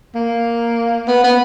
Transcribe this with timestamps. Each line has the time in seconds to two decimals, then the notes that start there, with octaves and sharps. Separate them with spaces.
0.15 A#3
1.08 B3
1.24 B3